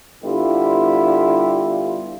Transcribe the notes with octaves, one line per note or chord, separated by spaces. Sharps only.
D3 G3 B3 E4 F4 G4